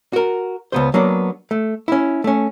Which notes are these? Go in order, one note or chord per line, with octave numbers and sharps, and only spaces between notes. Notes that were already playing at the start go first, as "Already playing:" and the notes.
F#4 A#4
C#2 B3 C5
F#3 A#3 B3 D4
A3
C#4 E4
A3 C#4